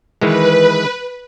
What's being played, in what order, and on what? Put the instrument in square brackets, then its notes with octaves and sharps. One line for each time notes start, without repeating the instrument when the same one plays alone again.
[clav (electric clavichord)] D#3 E3 G#3 [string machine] B4